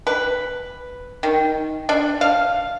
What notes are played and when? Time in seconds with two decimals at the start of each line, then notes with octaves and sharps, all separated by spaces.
0.07 B4
1.23 D#3
1.89 D4
2.21 F5